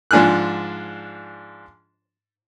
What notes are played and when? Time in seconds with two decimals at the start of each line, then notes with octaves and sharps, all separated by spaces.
0.11 G#2 F3 D4 G#5 F6 F#6